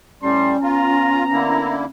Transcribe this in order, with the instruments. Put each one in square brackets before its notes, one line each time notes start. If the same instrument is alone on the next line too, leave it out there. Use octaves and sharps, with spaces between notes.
[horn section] A2 A5 C6 [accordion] G3 [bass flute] C#4
[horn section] B3 A#5 [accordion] F4
[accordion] D3 A#3 E4